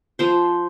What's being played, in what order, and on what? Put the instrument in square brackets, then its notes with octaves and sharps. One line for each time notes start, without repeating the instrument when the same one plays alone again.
[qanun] F3 C5